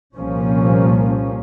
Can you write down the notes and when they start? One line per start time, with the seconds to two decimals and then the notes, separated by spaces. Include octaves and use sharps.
0.16 C2 A#2 F3 A#3 C#4